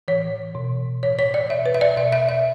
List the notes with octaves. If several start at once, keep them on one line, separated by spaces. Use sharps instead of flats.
A2 E3 C#5
B2
A2 E3 C#5
C#5
D5
B2 E5
B4
E5
D5
B2 E5
E5
E5